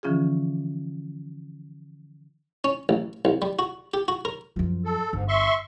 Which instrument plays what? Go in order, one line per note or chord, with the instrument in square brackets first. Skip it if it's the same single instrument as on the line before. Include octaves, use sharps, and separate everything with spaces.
[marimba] D3 E3 F3 C#4 F4 G#4
[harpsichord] C#4
A1
C2
G3
F#4
G4
F#4
A#4
[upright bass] F#2 F3
[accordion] A4
[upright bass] G1 [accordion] G#2
[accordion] E5 C6 C#6